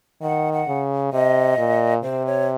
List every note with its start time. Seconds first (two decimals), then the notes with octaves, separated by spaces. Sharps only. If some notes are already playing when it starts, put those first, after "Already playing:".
0.22 D#3 F#5
0.53 F#5
0.68 C#3
1.13 C3 D#5
1.58 A#2
2.03 C3 C5
2.26 C#5